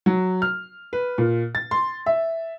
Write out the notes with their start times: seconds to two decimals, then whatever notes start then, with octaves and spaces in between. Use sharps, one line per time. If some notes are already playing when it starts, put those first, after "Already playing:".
0.06 F#3
0.42 F6
0.93 B4
1.18 A#2
1.55 A6
1.71 C6
2.06 E5